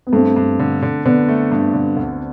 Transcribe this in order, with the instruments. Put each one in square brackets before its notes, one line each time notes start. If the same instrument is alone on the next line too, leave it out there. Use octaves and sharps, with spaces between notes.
[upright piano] B3
[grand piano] G2 [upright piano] A3 C4
[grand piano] G2
D3
D3
[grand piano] D3 [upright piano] B3 D4
[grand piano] A3
G2
D3
D2